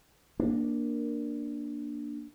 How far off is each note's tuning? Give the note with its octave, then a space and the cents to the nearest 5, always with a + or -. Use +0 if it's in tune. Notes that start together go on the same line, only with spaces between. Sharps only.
A#3 +10 D4 +0